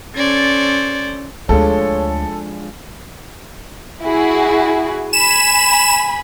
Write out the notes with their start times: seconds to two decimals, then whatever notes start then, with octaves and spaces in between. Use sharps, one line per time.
0.16 C#4 A4 C5 D5 G#6
1.49 D2 F3 G#3 D4 A4 C#5
4.03 E4 F#4 G#4
5.13 G#5 B5 E7